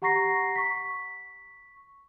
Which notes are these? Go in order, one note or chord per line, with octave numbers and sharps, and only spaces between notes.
G4 F#5 A#5 C#6 A#6 C7
C#6 B6